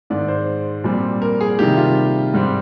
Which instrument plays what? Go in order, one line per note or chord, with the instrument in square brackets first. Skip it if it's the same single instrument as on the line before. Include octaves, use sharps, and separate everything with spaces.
[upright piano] G#2 D#3 G#3 D5
C5
A#2 G3 C4
A#4
G#4
C3 D#3 G3 A#3 G4
F4
G#2 G3 C4